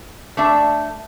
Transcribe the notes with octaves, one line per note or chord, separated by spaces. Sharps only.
A3 D4 E5